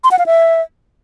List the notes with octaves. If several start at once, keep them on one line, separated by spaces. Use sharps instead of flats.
C6
F#5
F5
E5